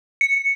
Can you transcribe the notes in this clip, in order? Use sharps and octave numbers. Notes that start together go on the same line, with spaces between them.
C#7